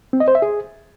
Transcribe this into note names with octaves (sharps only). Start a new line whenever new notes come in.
C4
D#5
C5
E5
G#4